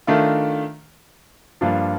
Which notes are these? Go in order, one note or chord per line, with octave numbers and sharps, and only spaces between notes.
D#3 A3 D4 F4
G2 F3 A#3 D4 F4